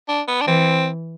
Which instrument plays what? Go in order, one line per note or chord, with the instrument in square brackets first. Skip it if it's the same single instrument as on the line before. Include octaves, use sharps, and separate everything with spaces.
[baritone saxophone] D4
B3
D4
[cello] E3 [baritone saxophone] C4